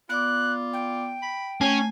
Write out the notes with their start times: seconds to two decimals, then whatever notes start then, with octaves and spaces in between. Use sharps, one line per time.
0.09 B3 F4 D5 D6 F#6
0.73 G5
1.22 B5
1.61 A3 C#4 G#5